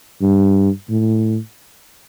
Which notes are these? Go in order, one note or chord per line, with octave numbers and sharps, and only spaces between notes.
G2
A2